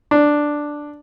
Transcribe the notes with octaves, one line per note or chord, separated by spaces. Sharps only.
D4